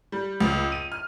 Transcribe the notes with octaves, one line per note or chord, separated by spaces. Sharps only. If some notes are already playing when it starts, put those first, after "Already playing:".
G3
C#2
D#7
F6